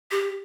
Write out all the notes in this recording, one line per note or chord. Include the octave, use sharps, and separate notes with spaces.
G4